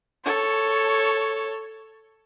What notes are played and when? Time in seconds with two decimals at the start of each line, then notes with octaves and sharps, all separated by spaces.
0.25 A4 C#5